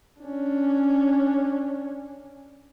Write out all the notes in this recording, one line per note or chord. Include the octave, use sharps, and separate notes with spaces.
C#4 D4